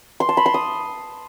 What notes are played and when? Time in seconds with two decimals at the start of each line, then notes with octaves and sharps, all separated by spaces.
0.20 C6
0.29 A5
0.37 B5
0.46 C6
0.54 D#6